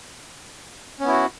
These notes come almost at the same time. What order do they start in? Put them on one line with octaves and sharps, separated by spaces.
C#4 B3 E4 F#4